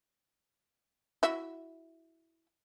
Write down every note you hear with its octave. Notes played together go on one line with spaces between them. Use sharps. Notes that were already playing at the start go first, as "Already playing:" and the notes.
E4 F#4 E5